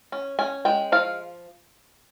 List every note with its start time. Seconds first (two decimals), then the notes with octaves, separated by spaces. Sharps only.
0.12 C#4
0.39 C#4 G#5
0.65 G#3 G5
0.92 F3 F5